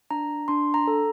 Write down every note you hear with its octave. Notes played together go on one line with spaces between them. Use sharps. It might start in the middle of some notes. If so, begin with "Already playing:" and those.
D4 A#5
D4 C6
A#5
A4